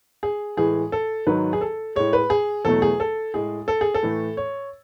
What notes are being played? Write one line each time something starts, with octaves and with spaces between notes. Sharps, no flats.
G#4
A2 E3 G#3 G#4
A4
G#2 D#3 F#3 B4
G#4
A4
A2 G#3 C#5
B4
G#4
E2 B2 F#3 A3 A4
G#4
A4
A2 G#3 G#4
A4
G#4
A4
A2 E3 A3
C#5